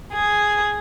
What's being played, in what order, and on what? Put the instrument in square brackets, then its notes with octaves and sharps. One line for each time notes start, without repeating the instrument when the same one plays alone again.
[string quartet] G#4